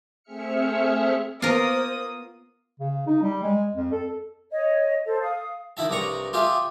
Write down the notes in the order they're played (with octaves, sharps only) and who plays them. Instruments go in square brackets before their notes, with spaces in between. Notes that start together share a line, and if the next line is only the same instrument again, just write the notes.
[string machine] A3 C4 G#4 E5 F6 C#7
[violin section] A#3 D#6 [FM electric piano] B3 [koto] F4 A#4 [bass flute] C5
[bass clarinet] C#3
D#4
G3
G#3
F2
A4
[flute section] C#5 D#5
A4 C5
F5 D#6
[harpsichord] D#3 E4 E5 A5
C2 G2 A#5 C#6
F4 G4 G#4 E5